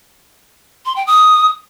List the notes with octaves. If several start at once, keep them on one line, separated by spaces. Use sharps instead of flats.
C6
G5
D#6